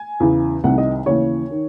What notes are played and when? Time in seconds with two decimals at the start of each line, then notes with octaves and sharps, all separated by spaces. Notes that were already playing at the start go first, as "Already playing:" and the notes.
Already playing: G#5
0.20 E2 C#3 E3
0.64 C2 C3 D#3 F#5
0.78 D#5
1.06 D#2 C#3 E3 C#5
1.51 D#3